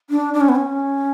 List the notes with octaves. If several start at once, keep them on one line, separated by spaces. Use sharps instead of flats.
D4
D4
C#4
B3
C#4